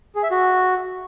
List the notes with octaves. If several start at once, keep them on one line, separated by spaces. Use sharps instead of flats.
G#4
E5
F#4